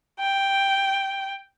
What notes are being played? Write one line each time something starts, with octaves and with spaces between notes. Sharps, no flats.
G5